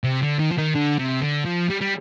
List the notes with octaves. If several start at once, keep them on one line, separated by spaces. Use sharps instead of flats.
C3
D3
D#3
F3
D#3
D3
C3
D3
F3
G3
G3